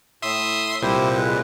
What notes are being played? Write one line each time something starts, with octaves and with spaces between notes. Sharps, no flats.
A2 E5 C6 D#6
C2 A#2 E4 G4 C5
G#3 B4